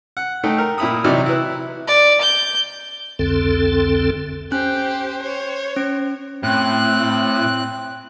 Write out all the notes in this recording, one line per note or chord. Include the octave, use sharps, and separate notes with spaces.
F#5
A3 D#4 D#5 G5
A#4
A#2 E4 A#5 B5 D#6
C3 E3 F#3 D#4 F#4 D5
E4 B4
D5
G6
C2 F2 D3 C4 A4
C#4 G4 C5 F#6
C#5
C#4 D7
A2 C4 F#6